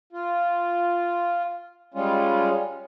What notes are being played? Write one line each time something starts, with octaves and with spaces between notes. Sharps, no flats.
F4
G3 G#3 C#4 F4